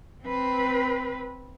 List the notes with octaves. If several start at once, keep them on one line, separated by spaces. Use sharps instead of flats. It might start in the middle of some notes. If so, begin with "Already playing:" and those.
C4 B4